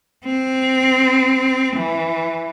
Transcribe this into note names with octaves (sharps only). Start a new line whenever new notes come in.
C4
E3